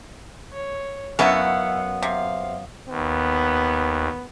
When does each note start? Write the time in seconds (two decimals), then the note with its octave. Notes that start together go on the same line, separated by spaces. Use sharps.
0.53 C#5
1.19 F#2 B3 C#4 D#4 E4 F5 F#5
2.02 C3 F5
2.89 D#2 B3